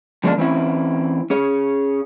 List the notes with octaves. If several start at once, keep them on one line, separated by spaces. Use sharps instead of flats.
D3 F3 G#3 A#3 C#4 D4
E3 C4 C#4 E4
C#4 G#4 C#5